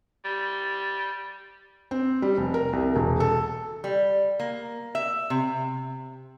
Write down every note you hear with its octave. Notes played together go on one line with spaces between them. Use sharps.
G3
C4
G3
F1
A#4
C2
E1
A4
G3
A#3
E5
C3